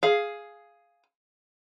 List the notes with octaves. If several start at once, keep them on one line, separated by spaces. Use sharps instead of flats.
G#4 F5